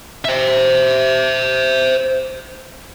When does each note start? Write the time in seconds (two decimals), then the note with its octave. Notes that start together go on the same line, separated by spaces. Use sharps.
0.25 C5 E5